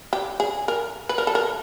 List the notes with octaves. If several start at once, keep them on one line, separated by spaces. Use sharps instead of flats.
G4
G#4
A#4
B4
A#4
A4
A#4